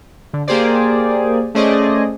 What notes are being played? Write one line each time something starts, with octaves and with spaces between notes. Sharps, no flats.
D3
A#3 G4 G#4 C5 D5
A3 C#4 G#4 C5 D5 D#5